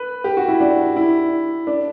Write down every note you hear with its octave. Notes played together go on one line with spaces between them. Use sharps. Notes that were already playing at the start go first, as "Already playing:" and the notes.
Already playing: B4
G4
F#4
E4
D4
E4
D4